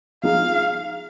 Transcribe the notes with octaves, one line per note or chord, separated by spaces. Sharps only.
F3 G#3 D#4 G#4 F5